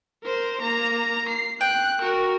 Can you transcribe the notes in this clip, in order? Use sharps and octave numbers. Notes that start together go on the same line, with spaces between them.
A#4 C5
A#3 A#5
C7
G5 F#6
F#4 A#4